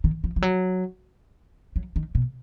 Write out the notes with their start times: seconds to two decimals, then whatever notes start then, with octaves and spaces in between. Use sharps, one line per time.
0.04 D#3
0.24 F3
0.36 F3
0.42 F#3
1.76 F#3
1.96 D#3
2.15 B2